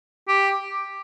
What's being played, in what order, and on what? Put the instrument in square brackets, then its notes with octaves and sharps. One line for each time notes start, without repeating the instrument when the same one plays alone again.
[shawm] G4